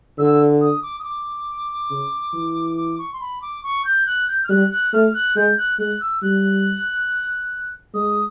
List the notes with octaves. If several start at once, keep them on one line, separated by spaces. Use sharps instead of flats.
D3 E6
D#6
D6
D#6
D6
C#3
E3
D6
C#6
C6
B5
D6
C#6
G6
F#6
G6
F6
G3 F#6
F#6
A3 F6
F#6
G#3 G6
F#6
G#3 F#6
E6
G3 F#6
G#3 D#6